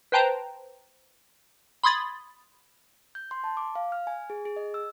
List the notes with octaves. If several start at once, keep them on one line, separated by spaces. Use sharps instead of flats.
B4 C5 G5 A5 A#5
B5 C6 D#6 G#6 A6
G6
C6
A5
D6
F5
F6
G#5
G#4
G#4
D#5
E6